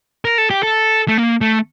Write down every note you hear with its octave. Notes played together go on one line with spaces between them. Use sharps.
A#4
A4
G4
A4
A3
A#3
A3